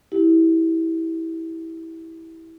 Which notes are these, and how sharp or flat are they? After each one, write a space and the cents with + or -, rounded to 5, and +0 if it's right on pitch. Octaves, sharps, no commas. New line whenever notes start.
E4 -15 G4 +0